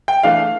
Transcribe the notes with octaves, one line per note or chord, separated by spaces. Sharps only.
G5
E3 A3 D4 F5